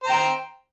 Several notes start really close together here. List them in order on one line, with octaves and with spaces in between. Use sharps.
C5 A#5 G5